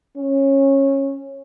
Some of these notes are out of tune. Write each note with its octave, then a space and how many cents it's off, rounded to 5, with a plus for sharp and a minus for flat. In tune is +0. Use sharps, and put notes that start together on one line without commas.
C#4 -20